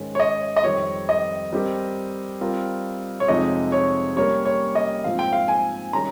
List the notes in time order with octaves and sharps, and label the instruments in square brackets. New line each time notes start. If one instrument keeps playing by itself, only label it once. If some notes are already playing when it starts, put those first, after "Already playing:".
Already playing: [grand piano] G#2 D#3 G#3 C#4
[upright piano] C#5
D#5
D#5
[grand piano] F2 D#3 G3 C4 [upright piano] C#5
[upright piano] D#5
[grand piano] G3 C4 G4 A#4
G3 C4 F4 A#4
[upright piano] C#5
[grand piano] F2 C3 F3 G#3 D#4 [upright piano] D#5
[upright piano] C#5
[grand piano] G3 A#3 C#4 G4 A#4 [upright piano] C#5
[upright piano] C#5
D#5
[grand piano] G#2 F3 C4 F4 [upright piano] F5
[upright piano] G5
F5
G#5
[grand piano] D#3 G3 C#4 G#4 [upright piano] A#5